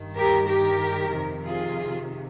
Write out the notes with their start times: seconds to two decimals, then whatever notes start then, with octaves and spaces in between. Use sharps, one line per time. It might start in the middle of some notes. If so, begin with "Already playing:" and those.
Already playing: G2 D#3
0.16 G4 A#4
0.48 G4 A#4
1.13 F2 C3 D#3
1.45 F4 G#4